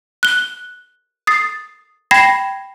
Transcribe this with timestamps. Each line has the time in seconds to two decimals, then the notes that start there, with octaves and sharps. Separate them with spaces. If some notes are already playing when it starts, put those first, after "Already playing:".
0.23 F#6 G7
1.27 D#6 A6 C7
2.11 G5 B5 G#6 A#6 C7 E7